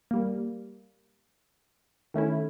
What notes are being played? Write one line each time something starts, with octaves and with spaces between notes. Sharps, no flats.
G3 A#3
D#3 A3 C#4 E4